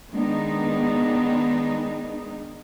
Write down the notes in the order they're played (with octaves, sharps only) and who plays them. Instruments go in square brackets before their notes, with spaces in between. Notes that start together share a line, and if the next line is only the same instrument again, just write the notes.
[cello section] D#3 G#3 B3 D4 D#4